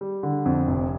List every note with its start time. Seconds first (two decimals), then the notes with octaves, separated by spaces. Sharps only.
0.01 G3
0.23 D3
0.46 F2
0.67 F1